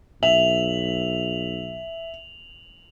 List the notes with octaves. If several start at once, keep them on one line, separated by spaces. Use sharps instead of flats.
B1 E5 F7 F#7